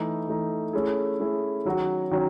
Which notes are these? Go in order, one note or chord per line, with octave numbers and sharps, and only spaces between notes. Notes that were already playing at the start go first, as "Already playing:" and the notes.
Already playing: E3 A3 D#4
E3 A3 D#4
A3 C#4 E4 G#4
A3 C#4 E4 G#4
D#3 F#3 C#4 F#4
D#3 F#3 C#4